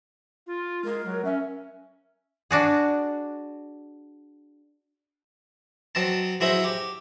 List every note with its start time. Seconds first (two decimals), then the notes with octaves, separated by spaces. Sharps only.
0.47 F4
0.85 G#3 A#4
1.05 F#3
1.25 C#4 E5
2.51 D4 F#4 G#4
5.95 F#3 C4 D#5 A5
6.41 F#3 E4 G#4 C5 D#5 E5
6.64 G4